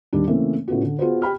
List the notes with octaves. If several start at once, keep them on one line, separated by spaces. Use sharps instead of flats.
D#2 G3 D4
C#3 E3 A3 A#3 C4
A2 C#3 B3 F4 F#4
D3
B3 F4 F#4 G#4 B4 C5
G4 G5 B5 F6